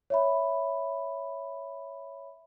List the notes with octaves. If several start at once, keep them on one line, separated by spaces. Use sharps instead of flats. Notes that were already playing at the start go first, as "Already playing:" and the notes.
C#5 E5 B5